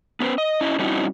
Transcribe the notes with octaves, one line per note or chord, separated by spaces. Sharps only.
B3 C#4 G#4 B4 C5
D#5
C#4 E4 D#5
G3 C4 C#4 D#4 E4 F#4